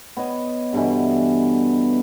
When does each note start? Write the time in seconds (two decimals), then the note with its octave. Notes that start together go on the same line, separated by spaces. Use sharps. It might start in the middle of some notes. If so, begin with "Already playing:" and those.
0.17 B3 C#5 D#5
0.73 G2 B2 D3 E3